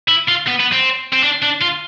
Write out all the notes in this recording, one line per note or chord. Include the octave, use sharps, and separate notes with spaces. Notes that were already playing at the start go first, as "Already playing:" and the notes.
E4
F4
B3
B3
C4
C4
D4
D4
F4